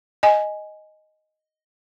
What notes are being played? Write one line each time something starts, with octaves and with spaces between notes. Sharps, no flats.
D#5 G#5